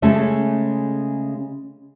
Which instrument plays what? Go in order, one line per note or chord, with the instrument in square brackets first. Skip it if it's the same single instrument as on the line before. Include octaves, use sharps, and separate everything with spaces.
[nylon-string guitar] C#3 G#3 A3 C#4 A4